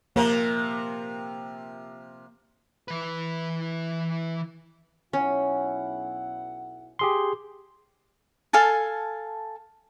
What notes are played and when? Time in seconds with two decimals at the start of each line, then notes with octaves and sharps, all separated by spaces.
0.16 C3 F3 A#3 A#4
2.88 E3 B4
5.13 B1 C#4 E4 F#5
6.99 G4 G#4 C6
8.53 A4 F5 G#5 A5